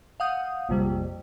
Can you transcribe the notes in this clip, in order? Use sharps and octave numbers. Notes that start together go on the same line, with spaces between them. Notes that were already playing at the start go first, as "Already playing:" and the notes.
F5 F#5 D#6 G6
A#1 F2 C3 G3